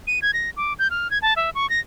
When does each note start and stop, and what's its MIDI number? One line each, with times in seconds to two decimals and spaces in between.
0.07 0.19 99
0.22 0.31 92
0.33 0.50 94
0.57 0.73 86
0.79 0.90 91
0.91 1.10 89
1.11 1.18 92
1.22 1.34 81
1.36 1.50 76
1.55 1.69 85
1.70 1.80 94